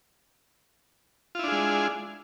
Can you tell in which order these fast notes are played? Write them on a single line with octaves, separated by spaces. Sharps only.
F4 E4 D4 G#4 G#3